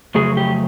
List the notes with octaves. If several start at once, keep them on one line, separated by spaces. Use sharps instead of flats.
F2 C#3 F#3 A3 G#4
G4